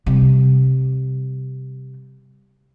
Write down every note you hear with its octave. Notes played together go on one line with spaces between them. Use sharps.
C3 G3